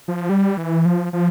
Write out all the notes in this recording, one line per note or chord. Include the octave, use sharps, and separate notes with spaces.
F3
G3
E3
F3
F3